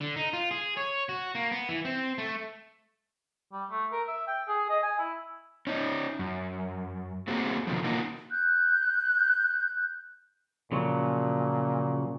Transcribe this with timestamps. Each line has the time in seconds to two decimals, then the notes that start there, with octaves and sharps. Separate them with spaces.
0.01 D3
0.16 D#4
0.33 F4
0.51 G#4
0.77 C#5
1.09 F#4
1.35 A#3
1.51 B3
1.69 E3
1.85 C4
2.18 A3
3.52 G3
3.70 A3
3.92 A#4
4.08 E5
4.27 G5
4.48 G#4
4.69 D#5
4.83 G#5
4.99 E4
5.67 C#4 D#4
6.19 F#2
7.28 A3 A#3 C4 F#4 G#4
7.67 B2 D3 D#3 F3
7.84 A#3 D#4 F4 F#4
8.31 F#6 G6
10.72 A#2 C#3 F3 F#3